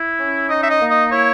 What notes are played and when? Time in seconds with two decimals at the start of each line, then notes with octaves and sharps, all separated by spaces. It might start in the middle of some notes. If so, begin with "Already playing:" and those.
Already playing: E4
0.19 C#4
0.50 D#4 D#5
0.63 E5
0.70 D#5
0.81 A#3
0.91 D#5
1.12 E4 C#5